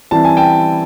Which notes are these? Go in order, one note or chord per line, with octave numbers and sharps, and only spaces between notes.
E3 G3 C4 E4 A5
G#5
G5 A5